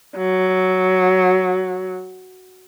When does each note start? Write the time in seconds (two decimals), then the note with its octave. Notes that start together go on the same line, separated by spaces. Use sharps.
0.18 F#3